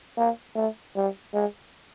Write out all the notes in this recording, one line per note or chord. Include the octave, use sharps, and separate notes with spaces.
A#3
A3
G3
G#3